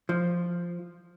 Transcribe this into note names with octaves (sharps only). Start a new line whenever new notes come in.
F3